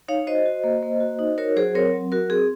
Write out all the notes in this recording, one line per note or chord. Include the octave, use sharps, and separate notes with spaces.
D#4 C#5 F5
F#4 C5 D#5
F#4
A#3
A#3
F#4
D#4
F#4 A#4 C#5
F#3 G#4 C5
C4 A#4 C#5
F#3
F#4 A#4
C4 G#4